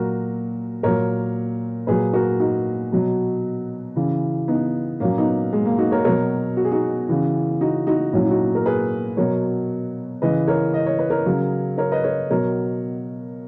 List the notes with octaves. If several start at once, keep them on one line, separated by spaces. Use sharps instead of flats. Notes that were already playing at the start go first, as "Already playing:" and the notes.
Already playing: A#2 F#3 F#4 A#4
A#2 F#3 A#4 C#5
A#2 F#3 G#4 B4
F#4 A#4
D#4 F#4
B2 F#3
C#3 E3
B3 D#4
A#2 F#3 A#3 C#4
B3 D#4
G#3
A#3
D#4 F#4
A#4 C#5
B2 F#3 A#4 C#5
F#4
G#4
D#4 F#4
C#3 E3
D#4 F#4
D#4 F#4
A#2 F#3 C#4 E4
E4
D#4 F#4
A#4
G#4 B4
B2 F#3 A#4 C#5
C#3 E3 B4 D#5
A#4 C#5
D#5
C#5
B4
A#4 C#5
C#3 F#3
A#4 C#5
B4 D#5
A#4 C#5
B2 F#3 A#4 C#5